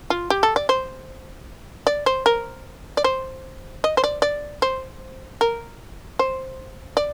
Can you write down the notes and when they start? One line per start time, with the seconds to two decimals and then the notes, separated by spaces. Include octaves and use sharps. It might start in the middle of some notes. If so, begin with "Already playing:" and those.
0.10 F4
0.30 G4
0.43 A4
0.56 D5
0.69 C5
1.87 D5
2.06 C5
2.26 A#4
2.97 D5
3.04 C5
3.84 D#5
3.97 C5
4.04 D5
4.22 D5
4.62 C5
5.41 A#4
6.19 C5
6.97 D5